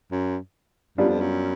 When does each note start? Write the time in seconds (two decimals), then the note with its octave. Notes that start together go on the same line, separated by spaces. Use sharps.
0.11 F#2
0.97 F#2 G3 B3 D4 F4
1.09 F2
1.21 F#2